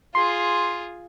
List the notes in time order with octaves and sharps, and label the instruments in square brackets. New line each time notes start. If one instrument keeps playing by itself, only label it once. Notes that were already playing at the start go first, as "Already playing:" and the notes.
[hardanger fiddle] F4 G#4 [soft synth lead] C6